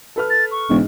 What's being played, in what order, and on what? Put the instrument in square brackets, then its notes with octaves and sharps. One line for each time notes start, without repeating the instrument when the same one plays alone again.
[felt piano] A4 B4 F6
[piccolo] A6
C#6
[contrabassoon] E1 [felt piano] G#2